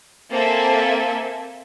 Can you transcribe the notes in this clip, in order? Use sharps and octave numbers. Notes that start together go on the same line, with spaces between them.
A#3 C4 A4 E5 G#5